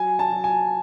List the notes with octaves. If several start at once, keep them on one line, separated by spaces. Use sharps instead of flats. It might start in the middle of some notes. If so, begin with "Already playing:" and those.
Already playing: F#3 G#5
A5
F#3
G#5